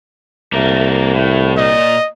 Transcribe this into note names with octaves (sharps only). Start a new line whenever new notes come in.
C2 A3 A#3 A#4
A2
A#2 D#5